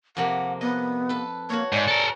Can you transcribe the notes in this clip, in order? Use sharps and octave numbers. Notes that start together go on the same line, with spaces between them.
F2 C3 A#3 F#5
B3 D#5
A4 B4
A#3 F#4 C#5
G#2 G#4 D5 E5
A4 A#4